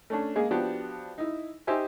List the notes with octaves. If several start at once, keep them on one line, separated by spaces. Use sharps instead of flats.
A3 C#4 D4
G#3 A#3 G#4
F3 B3 D4 F#4 G4
D#4 E4
D#4 G4 C5 E5 G#5